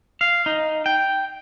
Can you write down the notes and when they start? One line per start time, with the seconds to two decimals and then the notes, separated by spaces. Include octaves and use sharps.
0.21 F5
0.46 D#4
0.86 G5